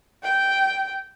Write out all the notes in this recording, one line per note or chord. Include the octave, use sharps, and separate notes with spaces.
G5